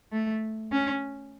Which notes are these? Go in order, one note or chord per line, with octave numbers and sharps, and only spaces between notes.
A3
C#4